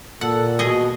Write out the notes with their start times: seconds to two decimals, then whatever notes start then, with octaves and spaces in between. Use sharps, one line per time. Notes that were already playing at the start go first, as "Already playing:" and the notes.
0.21 A#2 A4 F#5
0.59 B2 G#4 D#5